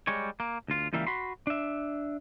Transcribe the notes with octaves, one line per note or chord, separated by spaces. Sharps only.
G3 G#3 C#5
A#3
D2 F4
C#2 E3 G3 A#3 E5 F5
F#4 B5 C6
D4 E5